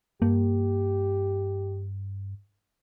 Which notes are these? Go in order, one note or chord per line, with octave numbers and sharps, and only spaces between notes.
G2 A#3 G4